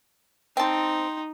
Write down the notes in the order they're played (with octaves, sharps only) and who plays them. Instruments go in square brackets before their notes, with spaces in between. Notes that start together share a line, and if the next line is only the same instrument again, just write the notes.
[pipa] C4 A5 [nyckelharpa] D#4 [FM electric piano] G5 C6